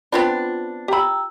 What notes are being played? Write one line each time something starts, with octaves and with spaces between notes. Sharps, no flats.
B3 C4 D4 F4 D5 B5
G4 G5 A#5 B5 E6